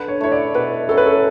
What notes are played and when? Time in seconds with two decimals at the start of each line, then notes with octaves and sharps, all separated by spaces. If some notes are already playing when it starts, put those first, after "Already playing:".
Already playing: D3 B4
0.08 C#5
0.21 A3 E4 C#5
0.32 D5
0.54 B2 B4
0.89 F#3 C#4 A4
0.97 B4
1.06 A4